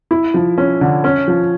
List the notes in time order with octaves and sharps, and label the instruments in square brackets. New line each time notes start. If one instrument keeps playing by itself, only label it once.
[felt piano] E4
F3
C#4
D3
C#4
F3